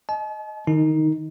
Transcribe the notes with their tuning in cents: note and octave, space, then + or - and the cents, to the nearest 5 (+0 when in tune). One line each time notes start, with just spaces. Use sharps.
D#5 +0 A5 -45
D#3 -15 D#4 +10